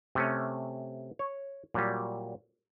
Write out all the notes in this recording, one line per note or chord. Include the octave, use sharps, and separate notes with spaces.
C3 A3 C#4
C#5
A#2 F#3 G3